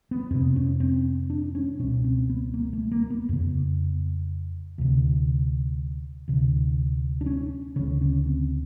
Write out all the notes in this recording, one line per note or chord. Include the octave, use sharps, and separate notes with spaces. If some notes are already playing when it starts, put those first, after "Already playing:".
B3
F2 C3 C4
C#4
C4
D4
C#4
C#2 B2 C#4
C4
B3
A#3
A3
A#3
B3
F2 C#3
D2 C3
D2 C3
D4
C#4
D2 C#3 C#4
C#4
C4